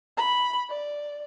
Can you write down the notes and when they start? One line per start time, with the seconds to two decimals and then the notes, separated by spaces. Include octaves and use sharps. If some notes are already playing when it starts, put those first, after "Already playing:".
0.17 B5
0.69 D5